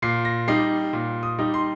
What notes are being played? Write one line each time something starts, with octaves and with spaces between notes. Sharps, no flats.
A#2 C7
A#6
G3 D#4 C7
A#2
D#6
G3 D#4
C6